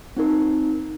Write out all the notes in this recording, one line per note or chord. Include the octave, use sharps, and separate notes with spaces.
C4 D#4 A#4